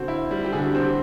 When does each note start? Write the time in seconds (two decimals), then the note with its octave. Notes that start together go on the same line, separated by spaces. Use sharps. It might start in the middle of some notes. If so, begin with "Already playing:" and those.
Already playing: D3 C4 F#4
0.08 E4
0.31 G3
0.45 G4
0.52 D3 G#4
0.62 F#4
0.67 G4
0.75 C4
0.82 G4